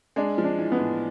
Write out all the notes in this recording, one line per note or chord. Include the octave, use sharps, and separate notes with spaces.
G#3 D4
F3
D4
E3
B3
A2